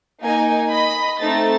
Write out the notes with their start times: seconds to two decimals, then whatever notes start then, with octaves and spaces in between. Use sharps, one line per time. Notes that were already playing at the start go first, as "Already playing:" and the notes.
0.20 A#3 D#4 G#5
0.71 D#5 B5
1.19 A3 C4 D#4 A6